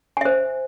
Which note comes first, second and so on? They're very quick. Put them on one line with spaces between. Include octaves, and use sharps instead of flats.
G#5 E5 C5